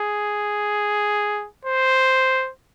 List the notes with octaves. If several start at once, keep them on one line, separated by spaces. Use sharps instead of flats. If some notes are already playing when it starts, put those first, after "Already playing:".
Already playing: G#4
C5